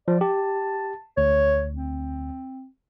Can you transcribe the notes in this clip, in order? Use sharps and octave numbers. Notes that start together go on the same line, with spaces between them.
F3 D5
G4 A5
D2 C#5
C4